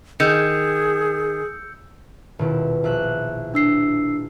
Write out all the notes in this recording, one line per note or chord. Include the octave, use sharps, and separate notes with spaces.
D#3 G#4 E6 G6 C#7
D#1 B2 E4
A#1 E5 F#6
D4 E6 C7